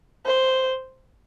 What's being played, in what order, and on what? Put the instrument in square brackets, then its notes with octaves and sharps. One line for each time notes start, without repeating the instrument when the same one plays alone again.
[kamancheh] C5